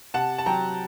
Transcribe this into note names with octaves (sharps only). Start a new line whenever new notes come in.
C3 F#5 A5
A5
F#3 G5 A#5